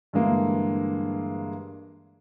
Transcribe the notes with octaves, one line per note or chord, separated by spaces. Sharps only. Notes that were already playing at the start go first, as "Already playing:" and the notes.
G2 D3 E3 G#3 A#3